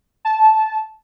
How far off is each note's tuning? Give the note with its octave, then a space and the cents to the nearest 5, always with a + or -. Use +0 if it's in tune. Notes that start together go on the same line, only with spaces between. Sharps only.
A5 -15